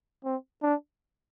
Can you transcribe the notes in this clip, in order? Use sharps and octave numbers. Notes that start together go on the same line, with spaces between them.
C4
D4